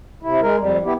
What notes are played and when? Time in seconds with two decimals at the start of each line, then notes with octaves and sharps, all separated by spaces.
0.23 C3 E4
0.42 G#3 A#4
0.59 F2 G3
0.85 B3 E4 G4